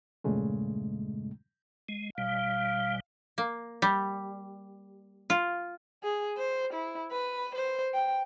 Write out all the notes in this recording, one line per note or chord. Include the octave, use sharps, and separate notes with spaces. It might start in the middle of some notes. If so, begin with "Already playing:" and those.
E2 G2 A#2 C#3 G#3 A3
G#3
G#1 B2 G3 F5
A#3
G3
F4
G#4
C5
E4
B4
C5
G5